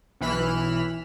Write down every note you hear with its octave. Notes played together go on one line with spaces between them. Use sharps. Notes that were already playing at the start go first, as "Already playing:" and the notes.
B1 E3 B5 F6 F#6 E7